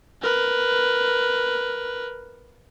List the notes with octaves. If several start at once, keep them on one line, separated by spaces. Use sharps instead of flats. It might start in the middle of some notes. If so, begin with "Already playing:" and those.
A#4 B4